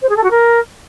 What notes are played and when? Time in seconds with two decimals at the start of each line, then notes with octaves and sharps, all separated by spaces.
0.02 C5
0.09 G#4
0.16 A4
0.23 F#4
0.30 A#4